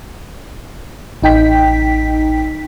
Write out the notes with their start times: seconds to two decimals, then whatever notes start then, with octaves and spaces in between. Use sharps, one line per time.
1.22 A1 D#4 G5 B6